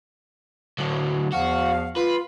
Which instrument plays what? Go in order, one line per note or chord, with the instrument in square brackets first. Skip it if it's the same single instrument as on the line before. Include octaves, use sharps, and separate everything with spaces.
[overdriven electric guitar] D3 F#3
[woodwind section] E2 F3 F5 [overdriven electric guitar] F#4
[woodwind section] F4 [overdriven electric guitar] B4